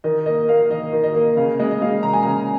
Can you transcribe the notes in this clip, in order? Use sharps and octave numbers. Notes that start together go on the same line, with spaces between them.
D#3 D#5
A#3 D#5
A#3 F5
D#3 D#5
D#3
D#5
A#3
C#3 F5
G#3 D#5
D#5
G#3 F5
C#3 A#5
G#5
C#3 A#5